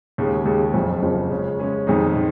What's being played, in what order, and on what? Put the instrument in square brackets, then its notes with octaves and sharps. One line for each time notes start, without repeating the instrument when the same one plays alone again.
[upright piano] D#2 C#3 G#3
D#2 C#3 G#3
F#1 F2 C#3 F3
F#1 F2 C#3 F3
C#3 G#3 C#4
C#3 G#3 C#4
F2 D#3 G#3 D#4
D#3